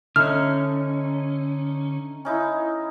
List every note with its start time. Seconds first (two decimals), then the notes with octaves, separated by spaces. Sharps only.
0.16 D3 A3 C#4 D#4 F6
2.25 C#4 D#4 E4